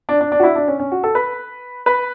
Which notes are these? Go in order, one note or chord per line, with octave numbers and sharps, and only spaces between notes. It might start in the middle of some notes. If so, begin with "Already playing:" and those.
D4
D4
D4
F#4
E4
D4
C#4
C#4
F#4
A4
B4
B4